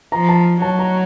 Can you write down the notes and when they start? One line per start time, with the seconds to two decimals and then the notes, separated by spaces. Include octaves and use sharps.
0.12 F3 A#5
0.29 A5
0.61 F#3 A5
0.79 A#5